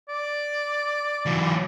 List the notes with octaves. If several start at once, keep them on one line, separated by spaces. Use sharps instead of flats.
D5
E3 F#3